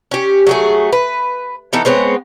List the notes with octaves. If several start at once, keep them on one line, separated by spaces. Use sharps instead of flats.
C#4 G4
F#3 A3 G#4
B4
E3 B3 D#4 A4
G#3 B3 C4 C#5